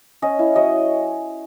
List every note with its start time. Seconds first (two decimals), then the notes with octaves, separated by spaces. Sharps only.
0.22 C#4 D#5
0.39 E4
0.56 F#3 D#5